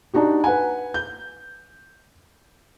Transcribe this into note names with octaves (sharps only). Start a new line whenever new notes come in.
D4 D#4 F#4 G4
B4 F#5 G#5
G6